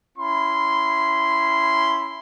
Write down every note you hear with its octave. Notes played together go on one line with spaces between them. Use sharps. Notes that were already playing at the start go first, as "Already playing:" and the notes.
C#4 E4 B5 C6